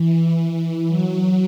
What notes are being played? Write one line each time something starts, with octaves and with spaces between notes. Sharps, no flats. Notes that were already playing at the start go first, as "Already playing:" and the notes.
Already playing: E3
F#3